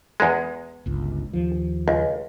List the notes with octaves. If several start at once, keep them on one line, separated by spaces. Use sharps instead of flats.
E2 G#3
G1 C#2
D#2 F3
C#2